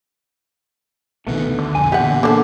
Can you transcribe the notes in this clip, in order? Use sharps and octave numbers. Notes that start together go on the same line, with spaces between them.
B1 C3 D#3 A3 B3
D2
D3
B1 F2 G#5
E2 A#2 G4 F#5
D3 A#3 D4 A4